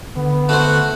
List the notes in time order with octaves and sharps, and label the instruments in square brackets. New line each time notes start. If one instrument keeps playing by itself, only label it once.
[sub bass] D3 [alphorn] B3
[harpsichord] A3 C5 [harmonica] F#4 F#5